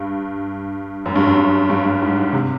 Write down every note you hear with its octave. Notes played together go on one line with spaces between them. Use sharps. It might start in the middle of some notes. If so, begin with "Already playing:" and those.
Already playing: G2
F#2
G2
F#2
G2
G2
G2
G#2
C3